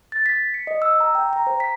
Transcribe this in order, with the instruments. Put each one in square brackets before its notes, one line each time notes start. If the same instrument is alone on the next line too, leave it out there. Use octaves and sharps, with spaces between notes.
[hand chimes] A6
B6
C#7
D#5
E6
A#5
G5
A#5
C5
B6